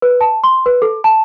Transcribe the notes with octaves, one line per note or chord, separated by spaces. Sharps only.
B4
A5
C6
B4
A4
A5